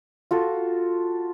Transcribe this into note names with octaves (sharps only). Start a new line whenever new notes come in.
F4 F#4 A4